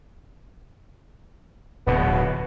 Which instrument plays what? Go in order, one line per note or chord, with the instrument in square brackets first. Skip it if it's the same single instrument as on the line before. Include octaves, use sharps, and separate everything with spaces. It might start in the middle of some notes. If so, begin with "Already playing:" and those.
[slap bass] D1 B2 [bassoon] B3